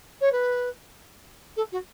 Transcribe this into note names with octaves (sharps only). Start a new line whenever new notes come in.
C#5
B4
A4
F#4